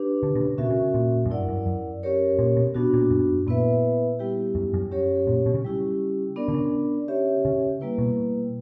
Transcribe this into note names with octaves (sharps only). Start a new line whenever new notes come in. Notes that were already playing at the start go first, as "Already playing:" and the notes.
Already playing: D4 G4 B4
D3
B2
C#3
B2 C#4 F#4 A#4 E5
C#3
A#2
F#2
G2 E4 A#4 D5 F#5
F#2
F#2
C#4 G4 A#4 C#5
A#2
B2
B2 B3 D4 F#4
A#2
F#2
A#2 B3 E4 B4 E5
G3 B3 E4 G4
F#2
F#2
F#3 C#4 G4 C#5
A#2
B2
C#3
G3 C#4 E4 G4
B3 D4 A#4 D5
D3
C#3
C#4 G4 C#5 E5
C#3
G3 A#3 E4 B4
B2